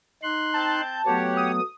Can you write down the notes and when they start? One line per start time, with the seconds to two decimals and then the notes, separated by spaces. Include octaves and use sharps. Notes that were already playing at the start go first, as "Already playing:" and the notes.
0.23 D#4 C6 F#6
0.54 C4 A5 G6
1.06 F#3 A3 B3 G4 C#5 F#5
1.37 D#6